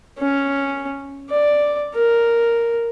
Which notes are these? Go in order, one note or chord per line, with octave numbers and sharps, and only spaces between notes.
C#4
D5
A#4